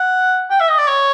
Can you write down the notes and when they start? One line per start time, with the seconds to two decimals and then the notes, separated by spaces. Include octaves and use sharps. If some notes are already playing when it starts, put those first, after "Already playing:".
Already playing: F#5
0.50 G5
0.60 E5
0.69 D#5
0.78 D5
0.87 C#5